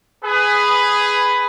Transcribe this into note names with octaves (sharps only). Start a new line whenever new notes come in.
G#4 B4